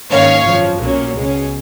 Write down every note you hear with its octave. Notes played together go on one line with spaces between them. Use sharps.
G#2 D#3 A#3 C#4 C#5 F5
G#1 F#2 F3
B1 A#2 F#3 A#3 C#4
C#2 B2 G#3 C#4